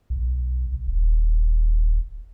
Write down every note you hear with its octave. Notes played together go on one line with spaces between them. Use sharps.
B1
D#1